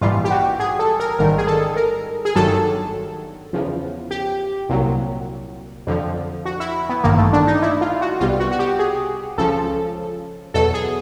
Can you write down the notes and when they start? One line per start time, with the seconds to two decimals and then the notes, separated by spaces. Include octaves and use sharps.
0.01 A#1 G#2 E3 G3 F4
0.25 G4
0.31 F#4
0.60 G#4
0.79 A4
1.00 A#4
1.19 A1 G#2 D#3 G3 A#4
1.38 G#4
1.47 A4
1.77 A#4
2.25 G#4
2.35 G1 G2 D#3 F#3 A4
3.53 E2 C#3 F3
4.11 G4
4.69 C2 A#2 F#3
5.87 F2 D3 F3
6.46 F#4
6.60 E4
6.89 B3
7.04 A1 G2 D#3 A#3
7.18 A3
7.33 D4
7.47 D#4
7.62 E4
7.81 F4
8.01 F#4
8.20 C2 B2 G3 F4
8.40 F#4
8.52 F#4
8.59 G4
8.79 G#4
9.38 C#2 C#3 F3 A4
10.54 E2 B2 F#3 A4
10.74 G#4